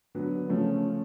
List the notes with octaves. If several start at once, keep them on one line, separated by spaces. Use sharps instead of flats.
D3 F#3 B3
C#3 F3 A3 C#4